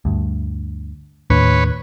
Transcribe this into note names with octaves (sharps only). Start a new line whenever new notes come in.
D2 G2
D#2 A2 D4 B4 C#5